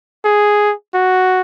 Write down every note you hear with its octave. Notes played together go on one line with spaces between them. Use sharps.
G#4
F#4